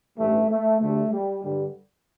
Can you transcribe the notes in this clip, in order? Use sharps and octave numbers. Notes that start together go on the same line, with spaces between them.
A1 G2 E3 G3 A3
A3
D2 D3 G3 A3
G3
G2 D3 G3